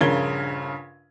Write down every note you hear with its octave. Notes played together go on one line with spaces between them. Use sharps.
A#1 G2 C#3 A#4 G#6 G7